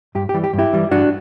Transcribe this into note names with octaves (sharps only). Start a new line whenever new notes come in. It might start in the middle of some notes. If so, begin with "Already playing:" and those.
G2 G4
G4
E3 G3
G4
G2
E4 G4
E3 G3
G2 D4 F#4